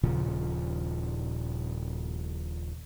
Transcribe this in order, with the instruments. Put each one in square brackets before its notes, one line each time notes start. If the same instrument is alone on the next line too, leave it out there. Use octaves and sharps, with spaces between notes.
[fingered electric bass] D#1 A#2 C#3 F3